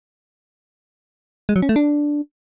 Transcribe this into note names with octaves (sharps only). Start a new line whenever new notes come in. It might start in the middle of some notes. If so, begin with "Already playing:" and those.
G#3
F#3
C#4
A3
D4